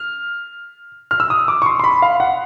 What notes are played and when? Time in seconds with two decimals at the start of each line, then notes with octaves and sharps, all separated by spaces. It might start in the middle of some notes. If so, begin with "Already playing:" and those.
Already playing: F6
1.11 F6
1.20 E6
1.30 D#6
1.48 D6
1.62 C#6
1.66 C6
1.79 C6
1.84 B5
2.02 F5
2.20 F#5